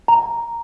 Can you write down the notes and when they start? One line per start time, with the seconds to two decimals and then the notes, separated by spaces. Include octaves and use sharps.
0.08 A#5